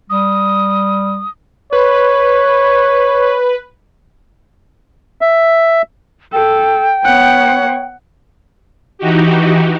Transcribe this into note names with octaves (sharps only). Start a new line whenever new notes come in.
G3 D#6
B4 C#5
E5
A4 G5
B3 C#5 F#5
E3 D#4 F#4 G4